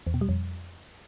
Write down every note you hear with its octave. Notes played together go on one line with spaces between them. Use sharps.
E2
B2
G3
F2